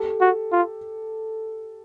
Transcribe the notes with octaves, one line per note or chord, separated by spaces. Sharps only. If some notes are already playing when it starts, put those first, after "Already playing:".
Already playing: G4 A4
F#4
F4